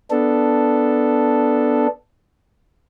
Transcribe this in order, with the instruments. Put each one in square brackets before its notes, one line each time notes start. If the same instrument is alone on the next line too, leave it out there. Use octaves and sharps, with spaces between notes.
[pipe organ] B3 D4 A4